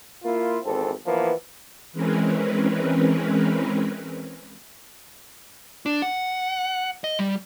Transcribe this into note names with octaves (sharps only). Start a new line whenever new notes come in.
A#3 E4 F4
G#1 E2 C4 A4
E3 F3 A#3 B3
E3 G#3 C4 C#4 A#4 B4
D4
F#5
D#5
G3